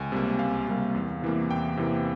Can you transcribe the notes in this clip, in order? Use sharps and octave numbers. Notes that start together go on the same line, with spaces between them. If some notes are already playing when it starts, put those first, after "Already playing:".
Already playing: C#2 G#5
C3 G3 A#3
C#2 F5
C3 G3 A#3
E2
C3 E3 A#3
E2 G5
C3 E3 A#3